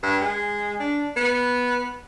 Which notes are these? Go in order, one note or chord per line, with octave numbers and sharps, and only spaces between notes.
G2
G#3
D4
B3